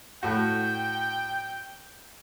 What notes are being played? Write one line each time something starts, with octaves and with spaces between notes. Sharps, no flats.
A2 F#4 G5